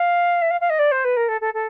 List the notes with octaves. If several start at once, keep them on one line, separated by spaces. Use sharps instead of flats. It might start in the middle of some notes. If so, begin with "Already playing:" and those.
Already playing: F5
E5
F5
F5
D#5
D5
C5
B4
A#4
A4
A4
A4